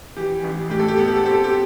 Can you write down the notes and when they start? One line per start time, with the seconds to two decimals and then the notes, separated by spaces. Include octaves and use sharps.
0.17 E3 G4
0.43 A1
0.70 A2 G4
0.79 A4
0.88 G4
0.98 B3 A4
1.08 G4
1.17 A4
1.25 C4 G4
1.35 A4
1.44 G4